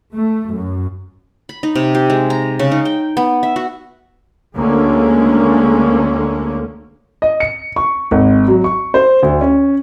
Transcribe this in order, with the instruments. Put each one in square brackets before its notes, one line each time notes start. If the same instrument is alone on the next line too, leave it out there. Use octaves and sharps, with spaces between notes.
[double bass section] A3
F#2
[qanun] B5
D#4
C3
G4
G#3
A#5
C#3
D#4
G5
B3
E5
F#4
[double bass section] D2 D3 G#3 A#3 C#4
[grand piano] D#5
C#7
C#6
G#1
F#3
C#6
C5
D2
C#4